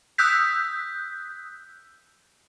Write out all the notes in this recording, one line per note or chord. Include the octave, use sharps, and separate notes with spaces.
D#6 E6 F#6 G6 B6